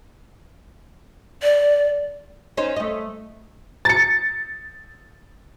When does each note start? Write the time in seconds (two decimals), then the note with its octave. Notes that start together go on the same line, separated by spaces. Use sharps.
1.43 D5
2.57 C#4 D#4 C5
2.76 A3 D#5
3.85 A6 C#7